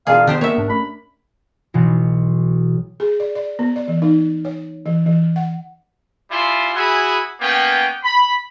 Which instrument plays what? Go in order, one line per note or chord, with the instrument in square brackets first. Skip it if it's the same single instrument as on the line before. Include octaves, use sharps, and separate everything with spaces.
[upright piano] E1 [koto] F4 G#4 [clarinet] F5
[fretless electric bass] D#3 [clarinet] B3 [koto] D4 G4 C5
[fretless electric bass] A#3 [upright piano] A#4 [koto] C#5 E5
[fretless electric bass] G#2 [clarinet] D4
[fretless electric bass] A3 C#4 D4 [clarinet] B5
[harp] B1 B2 E3 F#3
[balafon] G#4
D5
D5
B3
D5
E3
D#4
C#5
E3
E3
F#5
[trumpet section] G3 E4 F4 G#5 C6
E4 F#4 G#4 G#5 B5
A#3 B3 C#4 G5
B5